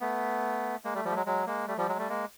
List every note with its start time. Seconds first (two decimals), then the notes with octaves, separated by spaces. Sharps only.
0.01 A3 B3
0.84 G#3 A#3
0.95 G3 A3
1.05 F3 G3
1.10 A3
1.15 F#3 G#3
1.26 F#3 G#3
1.47 G#3 A#3
1.67 G3 A3
1.78 F3 G3
1.88 F#3 G#3
1.98 G3 A3
2.09 G#3 A#3